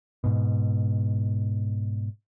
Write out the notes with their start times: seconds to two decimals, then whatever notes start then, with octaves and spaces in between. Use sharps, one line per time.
0.24 G#2 B2